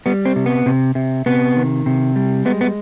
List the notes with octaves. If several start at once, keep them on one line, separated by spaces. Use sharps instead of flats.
G3 B3
C4
C3
B3
C3
C3
C3 B3
D#3
C3
G3
G#3 B3
B3